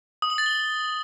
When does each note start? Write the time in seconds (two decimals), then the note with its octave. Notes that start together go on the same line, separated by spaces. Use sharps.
0.22 D#6
0.30 F#7
0.38 A6
0.46 G7